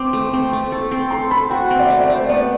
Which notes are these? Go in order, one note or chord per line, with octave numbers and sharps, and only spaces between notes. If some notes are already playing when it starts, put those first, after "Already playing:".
Already playing: C4 D6
A3
C4
A3
A4
C4
A4 C6
A4 B5
F#4 G5
C4
D5
A3 E5
D5
A3 C5
B3 D5